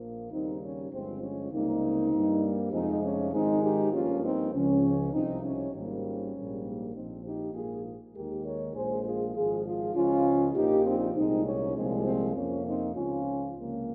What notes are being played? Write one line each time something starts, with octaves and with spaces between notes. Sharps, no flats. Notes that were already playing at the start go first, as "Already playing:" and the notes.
Already playing: A#1 A#2 F3 A#3
D#2 C#3 G3 A#3 C4 D#4
C#4
G1 G2 F3 G#3 C4
C#4
C#2 C3 G3 A#3 C4 D#4
G2 G3 A#3
F2 C3 F3 G#3 C4 D#4
C#4
G#1 G#2 D#3 G#3 C4 D#4
D#4 G4
G2 F3 A#3 C#4 F4
C4 D#4
C#2 C#3 F3 C#4
C2 C3 F3 C4 D#4
C#4
G#1 G#2 D#3 G3 A#3 C#4
A#1 G#2 G3 A#3
A#1 A#2 F3 C4 D#4
D#4 G4
A#1 G#2 F3 A#3 F4 G#4
D#2 D#3 G#3 G4 A#4
A#4 C#5
A#1 A#2 F3 G#3 G#4 C5
F4 G#4
G#1 G#2 F3 F4 G#4
F4 G#4
C#2 C#3 F3 G#3 C#4 F4
A#1 A#2 F3 D#4 G4
C4 D#4
C2 A#2 G#3 C4 D#4
C#4
C2 A#2 F3 G#3 C4
C4
F2 C3 F3 A#3 C#4
C4 D#4
C#2 C#3 F3 C#4 F4
C#2 C3 F3 A#3 C#4